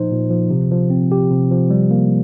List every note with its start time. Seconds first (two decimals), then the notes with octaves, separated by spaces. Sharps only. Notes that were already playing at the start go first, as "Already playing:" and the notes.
Already playing: A#2 F3 D#4 C5
0.11 A#2
0.30 F3
0.51 C3
0.72 F3
0.90 C4
1.12 G4
1.31 C3
1.51 F3
1.71 G3
1.91 A#3